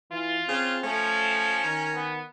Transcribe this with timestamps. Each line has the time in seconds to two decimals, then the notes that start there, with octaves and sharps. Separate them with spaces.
0.12 E3 F4
0.48 C#3 C4
0.84 F3 A3 C#4
1.64 D#3 A#4
1.94 B3